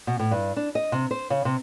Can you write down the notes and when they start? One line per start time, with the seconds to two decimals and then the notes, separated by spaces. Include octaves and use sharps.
0.07 B2
0.19 A2
0.31 G2
0.56 D4
0.75 D#5
0.92 C3
1.11 C5
1.30 C#3
1.45 C3